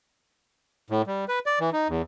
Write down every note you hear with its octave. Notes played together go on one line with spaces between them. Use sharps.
A2
G3
B4
D5
E3
D#4
E2